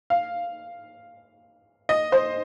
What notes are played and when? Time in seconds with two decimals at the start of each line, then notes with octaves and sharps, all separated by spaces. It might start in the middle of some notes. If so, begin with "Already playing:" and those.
0.10 F5
1.89 D#5
2.12 C5